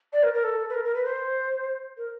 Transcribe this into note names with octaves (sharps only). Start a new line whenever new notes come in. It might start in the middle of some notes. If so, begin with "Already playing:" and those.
D5
A#4
A#4
A4
B4
A#4
A#4
B4
C5
A#4